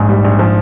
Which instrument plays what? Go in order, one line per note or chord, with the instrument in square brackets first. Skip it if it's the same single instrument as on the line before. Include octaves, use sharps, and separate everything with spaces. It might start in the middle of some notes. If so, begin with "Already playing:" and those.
Already playing: [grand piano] A#1 [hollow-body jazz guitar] G#2
[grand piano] G3
A#1
F3